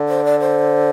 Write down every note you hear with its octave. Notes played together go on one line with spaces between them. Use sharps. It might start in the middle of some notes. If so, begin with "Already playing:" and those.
Already playing: D3
C5
D5
C5